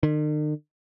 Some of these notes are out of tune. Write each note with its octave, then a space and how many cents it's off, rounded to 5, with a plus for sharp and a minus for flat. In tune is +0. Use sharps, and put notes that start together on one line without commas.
D#3 -45